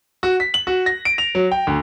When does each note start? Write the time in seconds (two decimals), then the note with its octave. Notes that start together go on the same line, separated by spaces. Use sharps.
0.23 F#4
0.40 B6
0.54 F#7
0.67 F#4
0.86 A#6
1.05 D7
1.18 F7
1.35 F#3
1.52 G5
1.67 D2